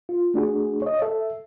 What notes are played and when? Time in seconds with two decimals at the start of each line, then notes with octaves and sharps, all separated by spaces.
0.09 F4
0.34 A3 D4 F#4 G#4
0.82 C#5 D#5
1.02 A4 E5